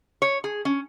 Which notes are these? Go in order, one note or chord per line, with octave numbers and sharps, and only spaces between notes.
C#5
G#4
C#4